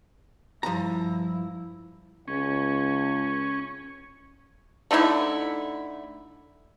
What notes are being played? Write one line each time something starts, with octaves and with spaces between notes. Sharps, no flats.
G2 F3 E4 A#5
C#2 C#4
D3 A3 D#4 E4